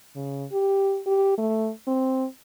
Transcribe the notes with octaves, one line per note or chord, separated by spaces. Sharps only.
C#3
G4
G4
A3
C4